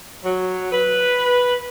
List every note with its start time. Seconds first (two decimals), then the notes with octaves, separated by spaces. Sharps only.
0.23 F#3
0.72 B4